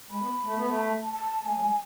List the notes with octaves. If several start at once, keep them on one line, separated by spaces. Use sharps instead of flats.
G#3 B5
B3
A3
B3
A3
A5
A5
A3 G#5
F#3
G#3